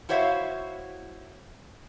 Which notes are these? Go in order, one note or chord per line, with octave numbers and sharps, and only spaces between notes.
E4 F#4 C5 C#5 E5 F5